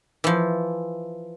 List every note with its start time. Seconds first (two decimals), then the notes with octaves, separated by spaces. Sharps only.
0.24 E3 F3